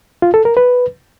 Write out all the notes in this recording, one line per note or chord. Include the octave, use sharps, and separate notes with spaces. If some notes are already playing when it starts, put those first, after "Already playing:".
F4
A4
A#4
B4